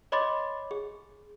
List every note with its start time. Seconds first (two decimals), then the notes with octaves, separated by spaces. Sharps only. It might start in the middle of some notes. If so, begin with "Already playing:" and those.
0.12 C#5 D#5 B5 C6 D6 A6
0.71 G#4